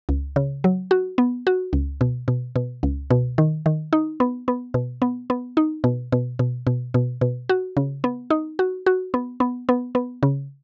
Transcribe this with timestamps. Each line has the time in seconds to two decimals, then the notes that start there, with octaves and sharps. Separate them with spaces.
0.09 C#2
0.36 C#3
0.64 F#3
0.91 F#4
1.18 B3
1.47 F#4
1.73 C#2
2.01 B2
2.28 B2
2.56 B2
2.83 C#2
3.11 B2
3.38 D#3
3.66 D#3
3.93 D#4
4.20 B3
4.48 B3
4.74 B2
5.02 B3
5.30 B3
5.57 D#4
5.84 B2
6.12 B2
6.39 B2
6.67 B2
6.94 B2
7.21 B2
7.49 F#4
7.77 C#3
8.04 B3
8.30 D#4
8.59 F#4
8.86 F#4
9.14 B3
9.40 B3
9.69 B3
9.95 B3
10.23 C#3